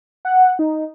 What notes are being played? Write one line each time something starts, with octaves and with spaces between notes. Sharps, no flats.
F#5
D#4